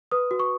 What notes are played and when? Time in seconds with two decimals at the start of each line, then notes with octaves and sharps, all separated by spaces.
0.12 B4 D#6
0.31 F#4
0.39 C#6